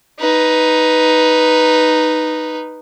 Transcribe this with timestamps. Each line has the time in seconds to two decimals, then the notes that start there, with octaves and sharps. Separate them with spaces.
0.20 D#4 B4